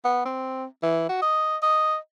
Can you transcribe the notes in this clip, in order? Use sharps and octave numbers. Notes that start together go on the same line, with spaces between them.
B3
C4
E3
F#4
D#5
D#5